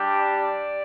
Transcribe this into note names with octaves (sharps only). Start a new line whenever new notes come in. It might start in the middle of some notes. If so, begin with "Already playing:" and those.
Already playing: G3 D4 G4
D5